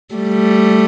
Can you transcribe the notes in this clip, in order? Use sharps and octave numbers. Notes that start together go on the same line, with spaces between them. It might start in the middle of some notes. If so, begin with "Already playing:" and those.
G3 A3